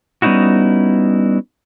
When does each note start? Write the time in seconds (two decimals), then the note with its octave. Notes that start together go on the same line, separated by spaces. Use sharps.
0.22 G3 B3 C#4 D#4 E4 F#4